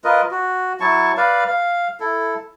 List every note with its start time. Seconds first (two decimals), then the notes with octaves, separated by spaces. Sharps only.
0.04 F4 A#4 B4 D#5
0.31 F#4
0.80 F#3 E4 A5 C#6
1.17 B4 D5 F5
1.48 F5
2.00 E4 A4